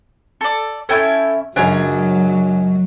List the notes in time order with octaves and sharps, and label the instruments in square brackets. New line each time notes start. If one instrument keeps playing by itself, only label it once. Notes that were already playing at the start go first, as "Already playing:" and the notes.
[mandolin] A4 D5
[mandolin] C#4 E4 C#5 [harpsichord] A4 G5
[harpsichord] C#2 F#2 [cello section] F#3 [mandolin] D4 G#4 C#5